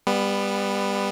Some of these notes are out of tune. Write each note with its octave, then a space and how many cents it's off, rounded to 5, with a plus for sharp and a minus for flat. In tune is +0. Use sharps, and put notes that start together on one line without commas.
G3 +25 B3 +0